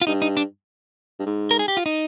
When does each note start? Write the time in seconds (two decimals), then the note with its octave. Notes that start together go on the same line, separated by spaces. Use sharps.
0.02 F4
0.07 G2 D#4
0.22 D#4
0.37 D4
1.19 G2
1.26 G#2
1.51 A#4
1.59 G#4
1.68 G4
1.77 F4
1.86 D#4